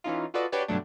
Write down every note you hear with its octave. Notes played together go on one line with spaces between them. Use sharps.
E3 C#4 D#4 F4
F4 F#4 A4 B4 D5 D#5
D4 F#4 G4 B4 C#5 D5
G2 B2 D3 F#3 A3 D4